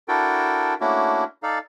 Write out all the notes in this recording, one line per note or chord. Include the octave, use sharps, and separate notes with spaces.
D4 E4 F#4 A4 A#4 G5
A3 A#3 C#4 D4 E4 F#4
D#4 A4 D5 F5